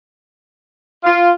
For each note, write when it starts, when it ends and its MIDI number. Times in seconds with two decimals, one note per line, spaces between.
1.04 1.31 65